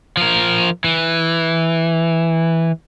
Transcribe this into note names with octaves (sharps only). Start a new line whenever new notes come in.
F3 A#4
E3